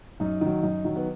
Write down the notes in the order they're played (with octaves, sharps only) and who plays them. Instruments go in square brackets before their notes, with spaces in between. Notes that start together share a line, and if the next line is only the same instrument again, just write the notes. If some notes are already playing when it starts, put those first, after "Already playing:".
[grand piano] F#2 D#4
D#3 F#3
F#2 D#4
D#3 F#3
B3